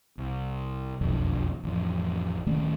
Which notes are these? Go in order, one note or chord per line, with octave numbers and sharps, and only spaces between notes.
C2
E1 B1 F2 D3
A1 F2
D1 D#3 A3 C#4